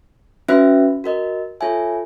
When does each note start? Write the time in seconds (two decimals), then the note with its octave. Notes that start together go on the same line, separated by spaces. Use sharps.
0.48 C#4 F#4 B4 E5
1.04 F#4 A#4 D#5
1.61 F4 A4 C#5 E5 G#5